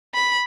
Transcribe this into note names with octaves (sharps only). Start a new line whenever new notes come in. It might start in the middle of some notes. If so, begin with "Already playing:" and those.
B5